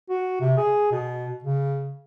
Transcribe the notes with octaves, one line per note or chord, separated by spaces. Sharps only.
F#4
C3
G#4
B2
C#3